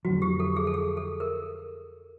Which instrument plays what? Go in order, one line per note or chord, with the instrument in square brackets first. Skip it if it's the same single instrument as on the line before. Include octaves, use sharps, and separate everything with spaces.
[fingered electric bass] F2 D3 F#3 [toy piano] F#4
[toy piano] G4
A4
G#4
A4
G#4
A4
A#4